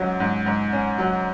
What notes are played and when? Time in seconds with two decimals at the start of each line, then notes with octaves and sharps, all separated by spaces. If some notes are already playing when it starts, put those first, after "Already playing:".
Already playing: G#2 F#3 C#4
0.20 G#2
0.46 G#2
0.73 C#4
0.98 F#3